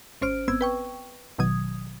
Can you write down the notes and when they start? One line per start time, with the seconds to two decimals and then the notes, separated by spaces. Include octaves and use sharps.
0.22 G#1 C#4 C5 F6 D7
0.48 G#1 B3 C4 E6 G#6
0.61 B4 G5 C#6
1.38 G#1 B2 D#3 F#3 D#6 G#6